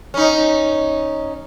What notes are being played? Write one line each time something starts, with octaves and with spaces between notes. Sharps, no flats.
C#4 D#4